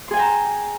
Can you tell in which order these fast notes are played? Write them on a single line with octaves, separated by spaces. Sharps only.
C6 G#4 G#5 G5 A#5